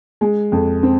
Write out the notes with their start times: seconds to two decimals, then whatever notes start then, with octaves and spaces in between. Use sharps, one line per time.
0.21 G#3
0.52 F2
0.83 C4